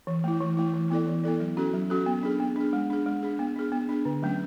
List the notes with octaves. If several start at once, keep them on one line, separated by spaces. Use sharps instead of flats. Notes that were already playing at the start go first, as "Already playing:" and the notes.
E3
A3 E4
E3
A3 E4
E3
B3 E4 A4 D5
E3
B3 E4 A4 D5
F#3
C#4 F#4 A4
F#3
C#4 F#4 A4
B3
D4 G#4
B3
D4 G#4
G#3
D4 G#4
G#3
D4 G#4
B3
D4 G#4
B3
D4 G#4
D3
F#3 A3 C#4